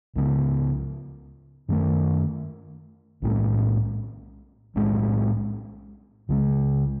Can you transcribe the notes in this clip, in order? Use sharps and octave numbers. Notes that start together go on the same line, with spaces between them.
C#2 C#3 G#3 B3
F#2 D#3 A3
B1 A2 G#3 C#4
B1 A2 G#3 C#4
C#2 C#3 E3 G#3